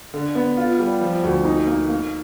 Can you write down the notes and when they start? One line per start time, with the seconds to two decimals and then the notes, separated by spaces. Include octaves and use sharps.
0.14 D3
0.35 B3
0.57 F4
0.79 G3
1.01 F3
1.23 D2
1.45 D#4
1.67 A#3
1.89 A#3